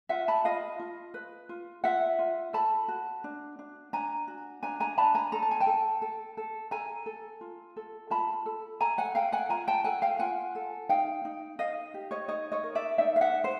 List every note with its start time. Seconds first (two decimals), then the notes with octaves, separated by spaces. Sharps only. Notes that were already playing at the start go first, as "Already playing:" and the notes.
0.09 F4 E5 F#5
0.28 A5 B5
0.45 F4 D#5 F5
0.80 F4
1.14 B4
1.49 F4
1.84 F4 E5 F#5
2.19 F4
2.53 A4 A5 B5
2.88 F#4
3.24 D4
3.59 D4
3.93 D4 G#5 A#5
4.28 F#4
4.63 D4 G#5 A#5
4.80 G#5 A#5
4.98 D4 A5 B5
5.15 G#5 A#5
5.32 A4 A#5
5.42 A5
5.51 G#5
5.60 G5 A5
5.67 A4
6.02 A4
6.37 A4
6.71 A4 G#5 A#5
7.06 A4
7.41 F4
7.77 A4
8.10 F4 A5 B5
8.46 A4
8.80 A4 G#5 A#5
8.98 F#5 G#5
9.15 A4 F5 G5
9.32 F#5 G#5
9.49 F4 G#5 A#5
9.68 G5 A5
9.84 A4 F#5 G#5
10.02 F5 G5
10.19 F4 F#5 G#5
10.55 A4
10.89 D#4 F5 G5
11.25 D#4
11.59 D#4 D#5 F5
11.94 G4
12.11 C#5 D#5
12.28 D#4 C#5 D#5
12.52 C#5 D#5
12.63 A#4
12.75 D5 E5
12.98 D#4 D5 E5
13.16 F5
13.21 E5 F#5
13.33 D#4
13.44 C5